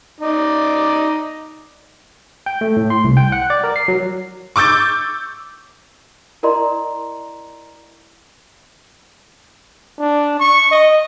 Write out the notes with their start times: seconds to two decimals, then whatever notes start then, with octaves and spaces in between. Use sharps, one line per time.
0.20 D#4 D5
2.46 G5
2.61 A3
2.77 A2
2.90 C6
3.04 C2
3.17 G5
3.32 F#5
3.50 D5
3.64 A#4
3.76 C7
3.88 F#3
4.56 C#6 D6 E6 G6 A6
6.43 E4 A#4 D5 D#5 A#5 C6
9.99 D4
10.40 C#6
10.71 D#5